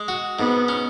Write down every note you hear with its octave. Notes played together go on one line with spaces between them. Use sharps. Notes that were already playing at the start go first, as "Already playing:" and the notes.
Already playing: G#3
F#4
G#2 B3
C#4